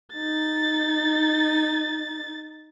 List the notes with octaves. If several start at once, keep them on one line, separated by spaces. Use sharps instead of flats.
D#4 A6